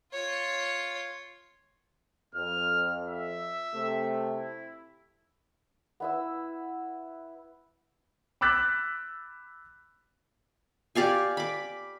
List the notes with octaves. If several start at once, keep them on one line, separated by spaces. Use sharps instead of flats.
F4 C#5
F2 F6
E5
C3 A3
E4
B3 E4 E6
B5 D6 E6 F#6 A6 B6
G4 D5 F5 G#5
B5 D6